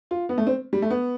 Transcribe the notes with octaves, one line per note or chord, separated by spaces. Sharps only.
F4
B3
A3
C4
G3
A3
B3